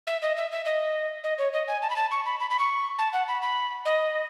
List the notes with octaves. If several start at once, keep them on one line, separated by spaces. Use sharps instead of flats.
E5
D#5
E5
E5
D#5
D#5
C#5
D#5
G#5
A5
B5
A5
C#6
B5
B5
B5
C#6
A5
F#5
B5
B5
D#5